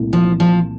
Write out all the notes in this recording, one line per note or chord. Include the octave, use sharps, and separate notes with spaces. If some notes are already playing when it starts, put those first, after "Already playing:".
Already playing: C2 A#2 A3 E4
F3
F3